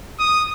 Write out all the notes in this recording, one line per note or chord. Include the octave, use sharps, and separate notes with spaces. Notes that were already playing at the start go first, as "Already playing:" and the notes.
D#6